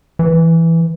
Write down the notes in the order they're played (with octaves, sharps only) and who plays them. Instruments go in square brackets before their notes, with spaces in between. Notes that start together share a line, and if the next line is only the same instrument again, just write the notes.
[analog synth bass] E3